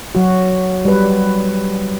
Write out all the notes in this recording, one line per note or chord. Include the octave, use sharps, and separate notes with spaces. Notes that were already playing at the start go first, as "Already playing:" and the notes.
F#3 F#4
G3 B4